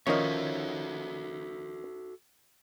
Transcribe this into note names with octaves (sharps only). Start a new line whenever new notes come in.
D#3 F3 C#4 D#4 F#4 A4 C#5 E5